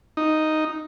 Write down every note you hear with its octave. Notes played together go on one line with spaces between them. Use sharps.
D#4